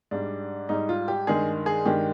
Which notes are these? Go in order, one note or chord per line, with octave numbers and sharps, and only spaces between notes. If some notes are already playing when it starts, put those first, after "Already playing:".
G#2 G3 D4
G#2 G3 D#4
F4
G4
G2 D#3 G#3 G#4
G#4
G2 D#3 G#3 G4